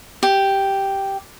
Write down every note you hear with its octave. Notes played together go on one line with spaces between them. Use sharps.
G4